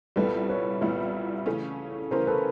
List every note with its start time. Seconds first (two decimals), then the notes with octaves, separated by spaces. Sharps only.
0.16 C2 A#2 G3 B3 E4 A4 B4
0.49 B4 C#5
0.81 C2 A#2 G3 B3 E4
1.46 C#3 E3 A3 C#4
2.11 C#3 E3 A3 C#4 A#4 C5
2.27 A4 B4